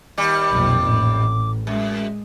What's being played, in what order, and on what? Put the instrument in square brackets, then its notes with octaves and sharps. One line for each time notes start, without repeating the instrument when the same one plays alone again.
[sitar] D#2 G3 [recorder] D6
[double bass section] B1 F2 A#2
A1
[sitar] F#2 [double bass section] G#3